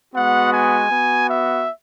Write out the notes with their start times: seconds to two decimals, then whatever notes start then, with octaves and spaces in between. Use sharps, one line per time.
0.14 G#3 B3 F#4 F#5
0.53 G#5
0.91 B3 F#4
1.30 E5